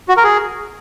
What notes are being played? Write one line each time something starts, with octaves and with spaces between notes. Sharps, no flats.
F#4
A#4
G#4